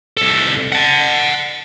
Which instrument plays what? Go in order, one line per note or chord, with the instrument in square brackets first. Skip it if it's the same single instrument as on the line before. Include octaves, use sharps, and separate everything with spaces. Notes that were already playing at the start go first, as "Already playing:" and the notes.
[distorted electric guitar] C2 A4
F#5 A5